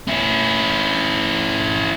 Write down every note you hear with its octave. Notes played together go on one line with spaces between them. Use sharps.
C#4 E4